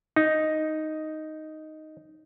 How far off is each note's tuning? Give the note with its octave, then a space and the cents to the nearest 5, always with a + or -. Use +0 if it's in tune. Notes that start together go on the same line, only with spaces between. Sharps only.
D#4 +0